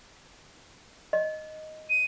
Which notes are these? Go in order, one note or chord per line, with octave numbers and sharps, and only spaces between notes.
D#5
D#7